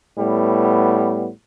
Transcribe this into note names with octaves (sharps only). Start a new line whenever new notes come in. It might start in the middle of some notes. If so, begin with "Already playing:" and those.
A2 G3 B3